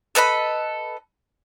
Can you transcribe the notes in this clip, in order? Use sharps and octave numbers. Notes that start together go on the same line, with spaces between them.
A4 B4 D#5 B5